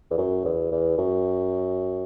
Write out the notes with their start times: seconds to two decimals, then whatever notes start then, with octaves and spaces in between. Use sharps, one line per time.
0.10 E2
0.18 F#2
0.45 E2
0.72 E2
0.98 F#2